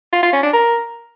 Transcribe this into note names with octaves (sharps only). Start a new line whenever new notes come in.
F4
F4
C#4
D4
A#4